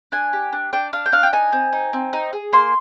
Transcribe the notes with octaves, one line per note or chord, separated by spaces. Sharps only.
D4 G#5
G4
D4
D4 G5
D4 F5
G5
D4 F5
G5
D#4 G#5
C4
D#4
C4
D#4
G#4
A#3 C6